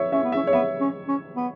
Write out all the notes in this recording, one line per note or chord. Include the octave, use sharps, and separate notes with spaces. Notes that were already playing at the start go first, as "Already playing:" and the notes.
Already playing: C#5 E5
C#4 E5
B3
E5
C#4
C#5
B3 E5
C#4
C#4
B3